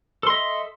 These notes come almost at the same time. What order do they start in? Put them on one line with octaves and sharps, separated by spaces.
A4 C6 D#5 E5